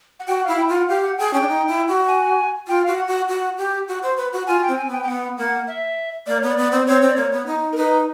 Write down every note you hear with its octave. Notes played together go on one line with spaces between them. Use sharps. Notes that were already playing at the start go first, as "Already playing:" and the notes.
F#5
F#4 G5
E4 F5
G5
F4 F#5
G4 F5
F#5
G#4 G5
C#4 G5
D4
D#4
E4
F#4
G#5
F4 G5
F#4 F5
F#5
F#4
F#4
G4
F#4
C5
B4
F#4
F4 G#5
G5
C4
G#5
B3 G5
G5
B3 F#5
A#3 F#5
E5
A#3 D5
B3 C#5
D5
B3
C4
C4 C#5
C4
D5
A#3 C#5
B3
D#4
A#4
D#4 B4